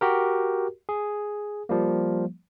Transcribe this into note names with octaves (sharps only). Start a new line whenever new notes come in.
F#4 G4 A#4
G#4
F3 G3 A#3